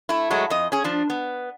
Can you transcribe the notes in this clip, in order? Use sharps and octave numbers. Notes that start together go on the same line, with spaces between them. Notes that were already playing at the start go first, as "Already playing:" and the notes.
A3 E4
F#3 G#3 A3
F2 D#5
C#4 G#4
F3 D4
B3